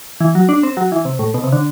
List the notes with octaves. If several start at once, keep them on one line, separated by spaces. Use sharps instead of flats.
E3
F#3
D4
C4
F#3
E3
C3
A2
B2
C3
D3